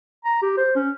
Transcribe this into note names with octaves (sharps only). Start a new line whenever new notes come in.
A#5
G4
C5
C#4